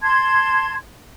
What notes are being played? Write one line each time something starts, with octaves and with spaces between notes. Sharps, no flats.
A5 C6 G#6